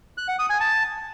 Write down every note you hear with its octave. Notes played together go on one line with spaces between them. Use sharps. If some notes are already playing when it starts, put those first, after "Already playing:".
F#6
F#5
D#6
G#5
A5